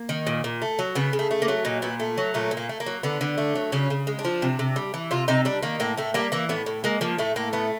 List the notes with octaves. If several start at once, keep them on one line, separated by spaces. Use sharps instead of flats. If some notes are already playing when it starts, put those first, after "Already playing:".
Already playing: A#3
D#3
A#2
A#2
A3
F#3
C#3 B3
C#3
A3
A3
A#3
F#3
A#2 D#4
A#2 B3
A3
F#3
A#2 A3
A#2
A#3
A3
A#3
F#3
D3 B3
D3
A3
F#3
C#3 C#4
C#3
G#3
D4
F3
C3
C3
G3
E3
C3 F4
C3 D#4
G3 D4
D#3 A#3
A2 A#3
A2 A3
G3 A#3
E3 A#3
A2 B3
A2
G#3 A#3
F3 A#3
A2 A3
A2 A#3
A3 B3